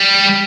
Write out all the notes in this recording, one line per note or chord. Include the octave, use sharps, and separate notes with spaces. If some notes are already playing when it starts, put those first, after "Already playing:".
Already playing: G3